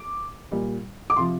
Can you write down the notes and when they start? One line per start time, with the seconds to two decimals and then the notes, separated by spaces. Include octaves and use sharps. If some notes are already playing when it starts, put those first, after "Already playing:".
Already playing: D6
0.51 A#2 G3
1.10 D6
1.16 C3 F3 C6